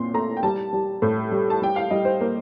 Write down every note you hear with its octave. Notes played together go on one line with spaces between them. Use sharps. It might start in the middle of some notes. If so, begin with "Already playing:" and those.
Already playing: A#2 C4 C6
A3 A#5
G5
G3 A5
G3
A2
G3
A5
G3 G5
F5
G3 D#5
C5
A#3